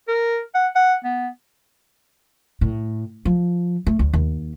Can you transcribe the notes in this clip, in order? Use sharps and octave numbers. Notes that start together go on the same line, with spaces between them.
A#4
F#5
F#5
B3
A2
F3
A3
D2
D#2